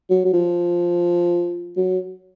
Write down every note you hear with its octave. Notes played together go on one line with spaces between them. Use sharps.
F#3
F#3
F3
F#3